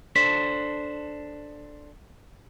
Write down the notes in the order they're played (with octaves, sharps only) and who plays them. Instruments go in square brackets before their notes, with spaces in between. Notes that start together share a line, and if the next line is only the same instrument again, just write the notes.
[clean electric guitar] D4 A4 C5 [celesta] B6